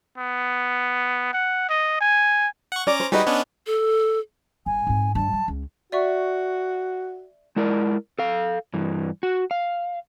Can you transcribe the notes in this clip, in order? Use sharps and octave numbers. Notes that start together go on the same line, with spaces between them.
B3
F#5
D#5
G#5
F#5 C#6
C#4 D5 A#5 D6
C5
G3 D#4 F#4 G#4 B4 D#5
B3 C#4 D4
A4
G1 G#5
G#2 C4
G2 G3 A5
F#3
C#2
F#4 D5 E5 C#6
G#3 E4 A#4 D5
A4 F5
G2 E3
F#4
F5